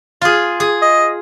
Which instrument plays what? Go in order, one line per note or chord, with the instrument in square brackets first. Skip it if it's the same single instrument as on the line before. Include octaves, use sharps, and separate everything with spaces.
[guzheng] F4 G#4
G#4
[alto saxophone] D#5